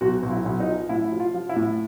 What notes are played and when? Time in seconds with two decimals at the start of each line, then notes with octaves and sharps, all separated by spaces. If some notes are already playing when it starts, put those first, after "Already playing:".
0.01 B1 F#4
0.23 B1
0.31 E4
0.45 B1
0.60 D#4
0.67 F3
0.89 A2 E4
1.12 F3
1.20 F4
1.34 F3
1.49 E4
1.56 A2